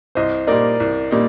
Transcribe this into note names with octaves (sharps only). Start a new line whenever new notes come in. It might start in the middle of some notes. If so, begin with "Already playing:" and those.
C2 C5 D#5
A#2 G3 A#3 D#4 A#4 D5
C2
A#2 G3 A#3 D#4